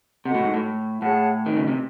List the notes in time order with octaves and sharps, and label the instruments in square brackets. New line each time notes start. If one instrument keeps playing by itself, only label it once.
[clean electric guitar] C3 [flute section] F#4 A4 D#5 F#5
[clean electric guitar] A2
G#2
A2
[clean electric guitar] A2 [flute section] G#4 C#5 F#5 A5
[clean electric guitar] D#3
C#3
C3